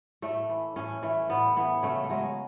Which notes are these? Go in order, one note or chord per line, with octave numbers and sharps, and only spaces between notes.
A2 A3
E3
A2 C#4
E3 A3
A2 B3
E3 B3
C#3 A3
A3
F#3 G#3